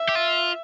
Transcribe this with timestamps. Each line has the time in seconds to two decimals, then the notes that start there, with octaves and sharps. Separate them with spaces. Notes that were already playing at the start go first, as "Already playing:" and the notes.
Already playing: E5
0.09 G4
0.15 F4